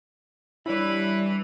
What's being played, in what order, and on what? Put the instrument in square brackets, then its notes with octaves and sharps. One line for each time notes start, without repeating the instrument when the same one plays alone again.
[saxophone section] E3 [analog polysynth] G3 D4 [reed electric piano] E4 C#5 D5 [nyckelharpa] B4 B5